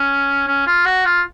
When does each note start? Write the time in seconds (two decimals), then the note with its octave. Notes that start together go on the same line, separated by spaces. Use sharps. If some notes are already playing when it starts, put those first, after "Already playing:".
Already playing: C#4
0.47 C#4
0.66 F4
0.85 F#4
1.05 F4